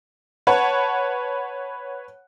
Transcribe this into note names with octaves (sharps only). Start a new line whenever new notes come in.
B4 C#5 F#5 A5